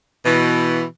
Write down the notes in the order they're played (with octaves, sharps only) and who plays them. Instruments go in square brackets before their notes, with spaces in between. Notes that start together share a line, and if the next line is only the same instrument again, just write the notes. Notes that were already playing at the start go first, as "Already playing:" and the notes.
[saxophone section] B2 E3